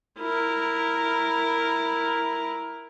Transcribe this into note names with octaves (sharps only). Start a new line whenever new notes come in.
E4 A#4